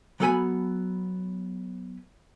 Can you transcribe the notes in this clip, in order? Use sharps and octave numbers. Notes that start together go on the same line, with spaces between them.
F#3 B3 A4 F#5 G#5 B5